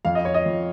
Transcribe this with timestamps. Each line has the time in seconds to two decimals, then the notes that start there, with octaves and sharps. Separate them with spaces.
0.05 F2 F5
0.15 D#5
0.25 C#5
0.34 D#5
0.46 F2